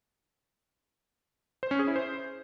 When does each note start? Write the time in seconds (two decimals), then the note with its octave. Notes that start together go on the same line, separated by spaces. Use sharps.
1.63 C5
1.71 C#4
1.79 G#4
1.87 E4
1.96 C5